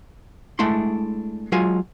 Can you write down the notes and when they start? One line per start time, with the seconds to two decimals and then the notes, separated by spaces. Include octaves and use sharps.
0.59 G#3 A3 D4 E4 C6
1.52 F#3 G#3 F4 G#5